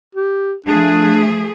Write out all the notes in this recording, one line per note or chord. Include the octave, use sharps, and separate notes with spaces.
G4
F3 A3 D4 G#4